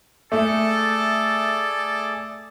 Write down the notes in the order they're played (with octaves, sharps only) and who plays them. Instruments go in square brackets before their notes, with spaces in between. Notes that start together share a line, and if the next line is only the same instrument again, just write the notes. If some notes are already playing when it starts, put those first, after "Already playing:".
[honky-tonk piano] A3 [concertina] G#4 D5 [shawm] A4